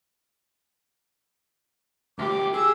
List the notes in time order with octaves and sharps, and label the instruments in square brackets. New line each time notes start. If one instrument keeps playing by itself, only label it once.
[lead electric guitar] D2 G4 [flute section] D6
[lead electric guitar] G#4 [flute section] E6